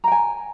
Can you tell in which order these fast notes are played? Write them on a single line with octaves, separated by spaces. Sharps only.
A#5 G5 G#5